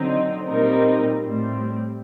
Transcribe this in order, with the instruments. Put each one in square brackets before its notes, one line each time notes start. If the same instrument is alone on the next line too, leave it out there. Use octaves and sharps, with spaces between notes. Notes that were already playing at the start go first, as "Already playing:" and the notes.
Already playing: [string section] D3 F#3 C4 D#4
A#2 G3 C4 D#4 A#4
A2 G3 C4